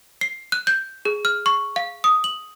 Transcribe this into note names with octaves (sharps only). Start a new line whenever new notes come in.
C7
F#6
G6
G#4
F6
C#6
F5
D#6
F#7